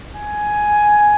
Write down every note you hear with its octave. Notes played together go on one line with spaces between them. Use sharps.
G#5